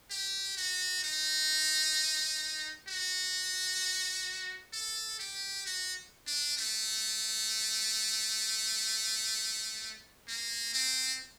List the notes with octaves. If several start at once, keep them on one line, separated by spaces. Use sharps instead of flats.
G4
F#4
D#4
F#4
A4
G4
F#4
D4
A3
A#3
C4